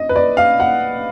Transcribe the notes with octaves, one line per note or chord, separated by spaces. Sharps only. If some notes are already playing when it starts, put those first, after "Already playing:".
Already playing: D#5
B4
D5
F5
F#5